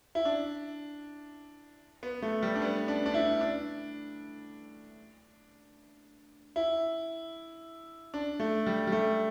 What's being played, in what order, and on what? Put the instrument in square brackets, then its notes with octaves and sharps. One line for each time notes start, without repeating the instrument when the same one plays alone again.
[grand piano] E4
D4
B3
A3
G3
D4
B3
D4
D4
E4
D4
E4
D4
A3
G3
G3
A3